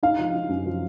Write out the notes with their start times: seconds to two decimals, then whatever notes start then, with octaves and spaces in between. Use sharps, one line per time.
0.03 D#4 F5
0.18 F3
0.34 D#4
0.49 F#2
0.66 F3